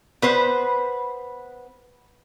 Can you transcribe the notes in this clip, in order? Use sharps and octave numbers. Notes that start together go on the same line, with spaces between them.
B3 B4 C5